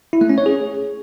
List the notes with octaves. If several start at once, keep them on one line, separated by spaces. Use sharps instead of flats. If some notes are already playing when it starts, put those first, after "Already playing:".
E4
A3
C#4
C#5
G#4